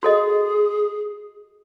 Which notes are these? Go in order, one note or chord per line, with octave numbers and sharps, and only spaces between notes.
F#4 G#4 A4 D#5